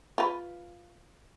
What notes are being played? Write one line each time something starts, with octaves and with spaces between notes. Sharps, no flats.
F4 B4